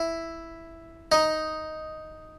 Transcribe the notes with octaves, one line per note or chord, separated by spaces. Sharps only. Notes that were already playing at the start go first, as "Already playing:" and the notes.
Already playing: E4
D#4